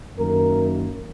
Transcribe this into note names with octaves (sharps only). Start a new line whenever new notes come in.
F#2 D#3 A#3 A#4